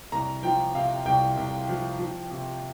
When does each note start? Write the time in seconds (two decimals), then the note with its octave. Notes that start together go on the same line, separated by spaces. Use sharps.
0.12 C2 A#5
0.43 F3 G5
0.75 C3 F5
1.05 C2 G5
1.37 C2
1.69 F3
1.99 F3
2.31 C3